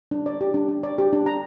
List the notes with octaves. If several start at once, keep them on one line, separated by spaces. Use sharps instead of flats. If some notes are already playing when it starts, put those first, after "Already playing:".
D4
D5
G4
D4
D4
D5
G4
D4
A#5